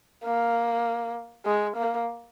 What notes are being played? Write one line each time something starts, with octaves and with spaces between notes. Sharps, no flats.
A#3
G#3
A#3